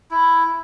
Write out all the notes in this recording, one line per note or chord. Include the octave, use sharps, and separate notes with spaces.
E4